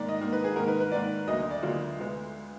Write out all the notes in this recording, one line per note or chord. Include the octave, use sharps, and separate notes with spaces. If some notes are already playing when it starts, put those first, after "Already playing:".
Already playing: G#2 D#3 A#3 D5
D#5
G#2 D#3 A#3
B4
G#4
G#2 D#3 A#3 A#4
B4
B4
G#2 D#3 A#3 D5
D2 D3 F#3 A#3 D#5
D#5
D5
D2 D3 F#3 A#3 F4
D2 D3 G#3 B3